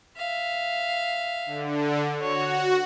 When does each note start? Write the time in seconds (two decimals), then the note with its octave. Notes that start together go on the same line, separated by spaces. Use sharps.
0.17 E5 F5
1.46 D3
2.21 F#4 C#5